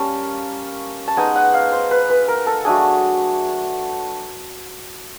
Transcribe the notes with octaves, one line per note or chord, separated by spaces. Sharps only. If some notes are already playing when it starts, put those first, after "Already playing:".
Already playing: G3 A#3 C#4 A5
A5
G#3 B3 D#4 G#5
F#5
F5
C5
B4
B4
A#4
A4
F#3 A3 D4 G#4